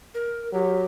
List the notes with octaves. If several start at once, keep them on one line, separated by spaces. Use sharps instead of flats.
A#4
F#3 G4